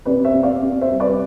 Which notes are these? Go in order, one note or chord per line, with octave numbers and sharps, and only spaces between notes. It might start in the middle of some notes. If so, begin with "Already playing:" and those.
C3 B4 D5
C5 E5
C3
D5 F5
C3
C5 E5
G3
B4 D5